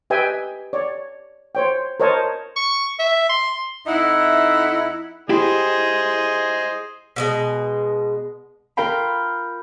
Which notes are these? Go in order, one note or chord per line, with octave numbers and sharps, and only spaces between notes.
G4 B4 D#5 E5 G5 G#5
C#5 D5
C5 C#5 G5
A#4 C5 C#5 D#5 A5
C#6
E5
C6
F2 D#4 E4 E5 F#5
E4 G4 G#4 C5 D#5
B2 E3 G#3
F4 A#4 F5 G5 B5